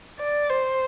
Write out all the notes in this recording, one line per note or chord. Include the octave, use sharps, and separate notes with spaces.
D5
C5